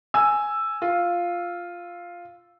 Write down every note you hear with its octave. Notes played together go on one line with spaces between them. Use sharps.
G#5 E6
F4